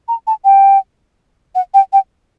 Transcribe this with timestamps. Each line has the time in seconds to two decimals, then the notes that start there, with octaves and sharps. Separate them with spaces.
0.08 A#5
0.27 A5
0.44 G5
1.55 F#5
1.74 G5
1.93 G5